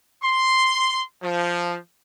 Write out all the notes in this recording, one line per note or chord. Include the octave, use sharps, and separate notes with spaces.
C6
F3